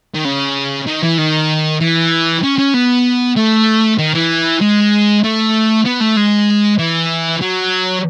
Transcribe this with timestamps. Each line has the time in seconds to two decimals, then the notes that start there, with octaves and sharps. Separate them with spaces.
0.15 D#3
0.25 C#3
0.87 D#3
1.03 E3
1.18 D#3
1.80 E3
2.43 C#4
2.58 C#4
2.74 B3
3.36 A3
3.99 D#3
4.14 E3
4.61 G#3
5.24 A3
5.86 B3
6.01 A3
6.17 G#3
6.79 E3
7.41 F#3